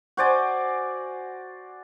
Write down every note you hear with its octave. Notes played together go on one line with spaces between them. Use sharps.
F#4 C5 D5 G#5